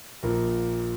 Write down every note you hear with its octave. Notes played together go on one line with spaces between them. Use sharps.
A#1 A#2 A#4